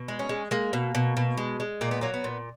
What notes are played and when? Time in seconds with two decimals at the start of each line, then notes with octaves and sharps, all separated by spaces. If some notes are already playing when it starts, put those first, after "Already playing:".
Already playing: B2
0.08 G#3
0.19 C#4
0.29 G#3
0.51 G#3 A#3
0.73 B2
0.95 B2
1.17 B2
1.37 G#3
1.60 G#3
1.81 A#2 A#3
1.91 B3
2.01 F#3 A#3
2.14 B3
2.24 A#2